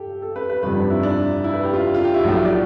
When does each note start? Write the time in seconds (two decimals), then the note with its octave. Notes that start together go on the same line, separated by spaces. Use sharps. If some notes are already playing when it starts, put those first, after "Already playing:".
Already playing: G4 A4
0.22 A4
0.36 B4
0.50 B4
0.63 G1 F2 C3 B4
0.76 D4
0.90 E4
1.03 D4
1.44 E4
1.53 B4
1.64 G4
1.74 F4
1.95 F4
2.04 G4
2.14 E4
2.24 B1 A2 F3 A3 G4
2.44 D5